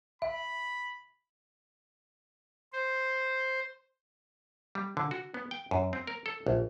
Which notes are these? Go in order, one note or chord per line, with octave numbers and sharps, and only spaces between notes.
E5 B5
C5
G3
D3
F#4
B3
G5
F#2
C4
A#4
A4
A#1